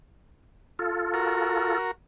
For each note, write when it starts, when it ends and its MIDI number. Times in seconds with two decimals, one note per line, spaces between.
0.79 1.78 65
0.79 1.78 69
1.14 1.91 66
1.14 1.91 70